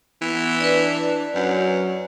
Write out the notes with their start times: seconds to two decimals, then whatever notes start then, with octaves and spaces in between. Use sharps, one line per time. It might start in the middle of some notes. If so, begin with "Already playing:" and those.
0.22 E3 B3
0.60 D4 B4 D5
1.35 F#2 F#3